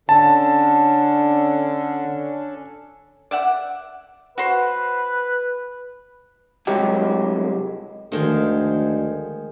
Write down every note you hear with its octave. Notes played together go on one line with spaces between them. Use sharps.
D3 C#4 D4 A4 A5
D5 E5 F#5
F#4 B4 C5
C2 F#3 G#3 G4
D2 D#3 F3 G#3